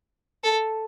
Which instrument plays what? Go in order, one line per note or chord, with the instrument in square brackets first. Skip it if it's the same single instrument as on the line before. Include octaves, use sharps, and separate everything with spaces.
[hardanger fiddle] A4